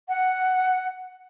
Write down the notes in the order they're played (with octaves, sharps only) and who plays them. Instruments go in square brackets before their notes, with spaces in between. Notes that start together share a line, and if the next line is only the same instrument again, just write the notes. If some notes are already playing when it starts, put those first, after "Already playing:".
[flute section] F#5